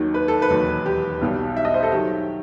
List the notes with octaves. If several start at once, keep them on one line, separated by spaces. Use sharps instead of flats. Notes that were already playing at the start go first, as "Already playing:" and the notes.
Already playing: D#2 D#3 F#3
B4
A4
B4
E1 D#2 D#3 F#3
G4
B1 B2 G3
E5
D#5
C5
A4
D#3 F#3 G4